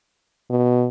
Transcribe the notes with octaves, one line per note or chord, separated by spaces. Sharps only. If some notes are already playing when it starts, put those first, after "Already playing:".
B2